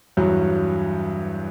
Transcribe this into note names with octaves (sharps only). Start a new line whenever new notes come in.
E2 G2 F#3